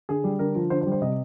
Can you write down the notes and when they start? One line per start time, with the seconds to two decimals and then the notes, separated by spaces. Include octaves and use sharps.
0.09 D3 G#4
0.24 G3
0.39 D3 A#4
0.55 F3
0.70 D3 C5
0.81 C5
0.86 G3
0.92 C5
1.02 C3 D#5